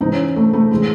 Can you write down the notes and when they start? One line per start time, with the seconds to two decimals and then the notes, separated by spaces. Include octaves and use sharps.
0.01 G#2 E3 D#4
0.12 C#4
0.36 A3
0.53 A3
0.71 A2 E3 G#3